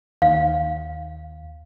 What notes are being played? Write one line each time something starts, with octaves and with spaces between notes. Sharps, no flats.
D#2 F5